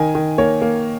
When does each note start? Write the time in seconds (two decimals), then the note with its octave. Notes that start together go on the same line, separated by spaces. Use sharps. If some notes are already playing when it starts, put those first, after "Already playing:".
Already playing: D#3 G#5
0.15 D#3
0.38 A#3 C#5
0.62 A#3